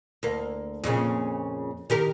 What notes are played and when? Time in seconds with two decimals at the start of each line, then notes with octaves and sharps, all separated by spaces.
0.23 D2 A#3
0.84 F2 A#2 C#3
1.90 D#3 G4 A#4